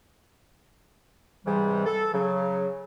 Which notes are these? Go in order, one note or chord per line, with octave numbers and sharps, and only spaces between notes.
G#2 C3 E3 G3
A4
C#3 F#3